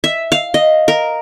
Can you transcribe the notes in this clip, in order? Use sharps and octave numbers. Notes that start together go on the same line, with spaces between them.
E5
F5
D#5
A#4